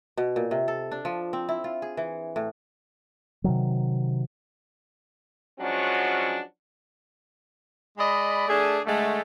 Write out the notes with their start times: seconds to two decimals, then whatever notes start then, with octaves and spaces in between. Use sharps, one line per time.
0.17 B2
0.36 A#2
0.51 C3
0.68 A4
0.91 D4
1.05 F3
1.33 C4
1.49 E4
1.64 F4
1.82 G#4
1.97 E3
2.36 A2
3.44 C3 D#3 F#3
5.60 F3 F#3 G#3 C#4 D4 F#4
7.98 G#3 D5 D#5 B5
8.48 A3 D4 G#4
8.85 D3 G#3 A3